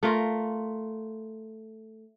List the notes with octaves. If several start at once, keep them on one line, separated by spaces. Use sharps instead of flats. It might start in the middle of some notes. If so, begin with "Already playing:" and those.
A3 F4 A#4